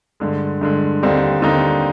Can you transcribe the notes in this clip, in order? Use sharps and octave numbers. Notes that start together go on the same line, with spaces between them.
G2 D3 G#3
G2 D3 G#3
D#2 D3 G3 C4 D#4
D#2 D3 G3 C4 D#4